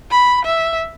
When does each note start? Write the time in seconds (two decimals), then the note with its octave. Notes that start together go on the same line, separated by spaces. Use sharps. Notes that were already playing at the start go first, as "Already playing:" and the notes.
0.11 B5
0.45 E5